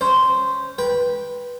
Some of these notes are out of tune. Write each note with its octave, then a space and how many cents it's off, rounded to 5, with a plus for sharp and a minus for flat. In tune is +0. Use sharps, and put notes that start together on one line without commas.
C#4 +0 C5 -10
B4 -15 G5 +0